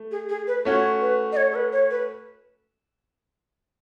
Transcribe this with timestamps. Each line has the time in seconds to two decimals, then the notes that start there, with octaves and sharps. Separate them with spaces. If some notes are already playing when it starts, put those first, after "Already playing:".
Already playing: A3
0.11 G#4
0.29 G#4
0.47 B4
0.65 A3 C#4 F#4 C#5
1.01 B4
1.32 D#5
1.37 C#5
1.52 A4
1.55 B4
1.72 C#5
1.91 B4